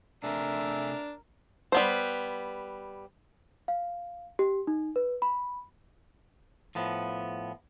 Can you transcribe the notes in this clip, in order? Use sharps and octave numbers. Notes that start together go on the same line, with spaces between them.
C3 A3 D4 G#4 A#4 E5
G3 B3 C5
F5
G4
D#4
B4
B5
A2 F3 B3